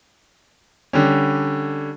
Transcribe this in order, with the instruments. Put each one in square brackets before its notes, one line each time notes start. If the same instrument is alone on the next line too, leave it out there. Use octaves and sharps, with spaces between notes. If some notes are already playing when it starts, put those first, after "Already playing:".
[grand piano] D3 G3 C#4